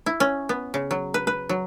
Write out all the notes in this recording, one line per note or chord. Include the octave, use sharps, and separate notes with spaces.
E4
C#4
B3
C#3
F#3
B4
B4
F#3